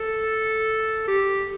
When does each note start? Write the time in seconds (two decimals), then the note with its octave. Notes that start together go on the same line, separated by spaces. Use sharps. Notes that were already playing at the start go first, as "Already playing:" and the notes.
Already playing: A4
1.08 G4